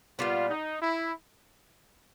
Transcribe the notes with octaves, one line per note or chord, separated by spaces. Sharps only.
A#2 G3 B3 F4
D#4
E4